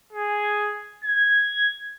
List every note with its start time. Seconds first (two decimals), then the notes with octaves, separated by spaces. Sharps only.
0.13 G#4
1.04 G#6